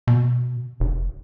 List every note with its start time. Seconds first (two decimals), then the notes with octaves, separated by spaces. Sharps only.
0.07 B2
0.80 F1